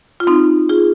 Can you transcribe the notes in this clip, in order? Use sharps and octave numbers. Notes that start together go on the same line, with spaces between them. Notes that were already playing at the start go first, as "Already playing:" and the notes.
F4
C4 D#4
F4 G#4